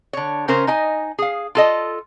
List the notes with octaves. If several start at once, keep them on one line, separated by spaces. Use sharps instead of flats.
D3 C#5
C#3 C#4 A#4 C5
D#4 D#5 G#5
G#4 F5
F4 A4 D#5